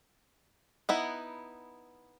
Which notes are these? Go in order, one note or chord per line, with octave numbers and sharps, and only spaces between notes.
B3 D#4 E4